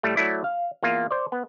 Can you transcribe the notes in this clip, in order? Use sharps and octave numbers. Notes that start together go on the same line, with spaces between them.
A2 G3 A3
F#3 A3 E4 D5
F5
E2 A#3 F4
C5 D5
B3